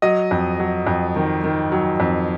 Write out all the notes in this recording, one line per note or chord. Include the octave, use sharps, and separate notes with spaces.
F#3 D#5
F2
F#3
F2
D#3
D#3
F#3
F2